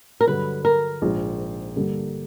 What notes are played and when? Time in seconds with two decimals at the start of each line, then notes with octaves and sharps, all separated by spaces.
0.21 A#4
0.27 G2 D3 F#3 B4
0.65 A#4
1.02 A#1 G#2 F3 G#3
1.76 G2 D3 G3 A#3